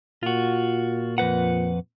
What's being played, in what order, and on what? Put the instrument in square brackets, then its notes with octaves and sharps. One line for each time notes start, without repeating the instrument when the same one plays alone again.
[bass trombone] A#2 [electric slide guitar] F4 F#4
[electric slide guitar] F2 B4 F#5